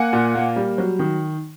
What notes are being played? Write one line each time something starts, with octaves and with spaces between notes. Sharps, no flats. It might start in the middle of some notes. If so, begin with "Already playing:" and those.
Already playing: A#3 F#5 G#5
A#2
A#3
G3
F#3
D#3